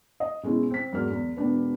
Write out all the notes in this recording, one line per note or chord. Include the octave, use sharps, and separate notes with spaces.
D#5
B2 G#3 C#4 E4
C4 B6
E2 G#2 F#3 A#4 F6
E2
E1 D4 B4